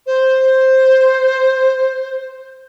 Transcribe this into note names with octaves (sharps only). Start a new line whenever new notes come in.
C5